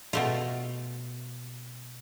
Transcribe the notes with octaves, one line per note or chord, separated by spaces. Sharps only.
B2 A3 F4